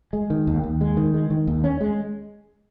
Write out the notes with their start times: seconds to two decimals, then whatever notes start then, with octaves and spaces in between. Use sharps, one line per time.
0.13 G#3
0.30 D#3
0.47 D#2
0.63 D#2
0.81 G#3
0.97 D#3
1.14 G#3
1.30 D#3
1.47 D#2
1.64 C#4
1.81 G#3